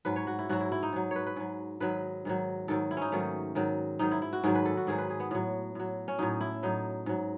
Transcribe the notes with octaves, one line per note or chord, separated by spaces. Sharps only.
G#2 F#3 B4
C#5
F#4
E4
G#2 F#3 F#4
E4
E4
D#4
G#2 F#3
B4 C#5
B4
G#2 F#3
G#2 D#3 F#3 B4
G#2 D#3 F#3
G#2 D#3 F#3 A4
E4
C#4 D#4
G#2 D#3 F#3 A3
G#2 D#3 F#3
G#2 D#3 F#3 D#4
E4
E4
F#4
G#2 D#3 F#3 G#4
B4
A4
F#4
G#2 D#3 F#3 G#4
B4
G#4
B3
A2 F#3
A2 F#3
C#4
A2 F#3 D#4
E4
A2 F#3 D#4
G#2 F#3